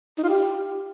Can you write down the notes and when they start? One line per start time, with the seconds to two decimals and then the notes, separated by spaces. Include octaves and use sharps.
0.18 D#4
0.23 F4
0.29 G4